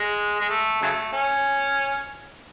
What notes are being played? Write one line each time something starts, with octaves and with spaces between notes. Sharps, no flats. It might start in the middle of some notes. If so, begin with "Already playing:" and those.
Already playing: G#3
G#3
A3
C#3 F#3 A3
C#4